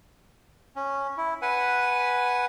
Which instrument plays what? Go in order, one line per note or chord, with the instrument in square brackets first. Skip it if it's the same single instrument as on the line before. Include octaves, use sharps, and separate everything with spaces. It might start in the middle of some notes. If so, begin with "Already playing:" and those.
[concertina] C#4
E4
B4 F#5 G#5